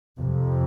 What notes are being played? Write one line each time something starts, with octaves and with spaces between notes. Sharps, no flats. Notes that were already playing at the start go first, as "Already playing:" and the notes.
F2 C3